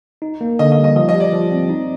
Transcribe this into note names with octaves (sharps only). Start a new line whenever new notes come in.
D#4
A#3
D3 D#5
D#5
G3
D#5
F3 D#5
D#5
G4
D5
F3
C4
D#4